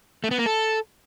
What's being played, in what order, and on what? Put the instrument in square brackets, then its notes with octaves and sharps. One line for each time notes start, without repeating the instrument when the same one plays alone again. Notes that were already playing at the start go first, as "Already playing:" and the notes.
[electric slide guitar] A3
B3
A#3
A4